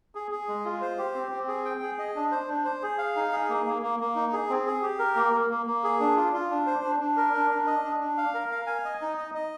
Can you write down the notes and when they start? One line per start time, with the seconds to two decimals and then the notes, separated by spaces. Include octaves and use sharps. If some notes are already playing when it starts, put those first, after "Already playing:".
0.15 G#4
0.31 G#4
0.48 G#3
0.65 F4
0.81 C5
0.98 G4
1.14 C4
1.32 C4
1.48 G#4
1.65 G5
1.82 G#4
1.99 D#5
2.16 D4
2.31 C5
2.48 D4
2.65 C5
2.83 G#4
2.98 F5
3.16 D#4
3.32 G#4
3.49 A#3
3.66 A#3
3.82 A#3
4.00 A#3
4.15 D#4
4.33 G#4
4.49 C4
4.66 G#4
4.82 G4
4.99 A#4
5.16 A#3
5.33 A#3
5.50 A#3
5.66 A#3
5.83 G#4
6.00 D4
6.16 F4
6.33 F4
6.50 D4
6.66 C5
6.84 D4
7.00 D4
7.17 A#4
7.33 D4
7.51 D4
7.67 D#5
7.84 D4
8.00 D4
8.17 F5
8.34 A#4
8.51 F5
8.67 G#5
8.85 D#5
9.01 D#4
9.17 D#5
9.34 D#5